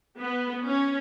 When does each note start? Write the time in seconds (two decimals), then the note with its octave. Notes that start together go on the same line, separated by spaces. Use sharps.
0.19 B3
0.65 C#4